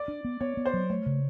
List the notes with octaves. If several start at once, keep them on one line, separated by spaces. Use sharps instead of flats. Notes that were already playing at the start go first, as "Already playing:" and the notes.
Already playing: D5
D4
B3
B3 C#5
B3
C5
F#3
A3 C#5
C#3